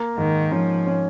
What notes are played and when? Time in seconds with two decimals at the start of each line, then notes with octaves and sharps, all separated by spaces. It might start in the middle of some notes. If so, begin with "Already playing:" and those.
Already playing: A#3
0.17 G#2 D#3
0.52 F3 C#4
0.87 C#4